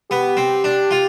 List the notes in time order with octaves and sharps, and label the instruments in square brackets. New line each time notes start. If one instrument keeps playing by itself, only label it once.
[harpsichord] B3 [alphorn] G4
[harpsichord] C4
D4
F4